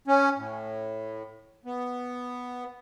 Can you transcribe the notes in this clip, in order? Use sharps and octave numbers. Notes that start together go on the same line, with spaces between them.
C#4
A2
B3